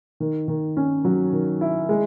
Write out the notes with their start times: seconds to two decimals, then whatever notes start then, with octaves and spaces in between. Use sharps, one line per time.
0.20 D#3
0.48 D#3
0.77 C#4
1.05 F#3
1.33 D#3
1.61 E4
1.89 G#3